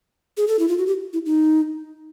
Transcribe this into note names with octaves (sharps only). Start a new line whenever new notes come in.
G#4
A4
E4
F4
F#4
G4
E4
D#4